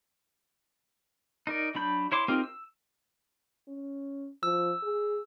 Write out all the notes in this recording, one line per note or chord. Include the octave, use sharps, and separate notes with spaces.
D#4 A#4 D5
F#3 D4 B5 G6
E4 C#5 C6 D6
C4 D#4 F4 G4 A#4
E6
C#4
F3 E6
G#4